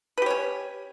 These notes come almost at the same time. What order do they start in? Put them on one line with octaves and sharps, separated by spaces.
B4 G4 C#5 C#4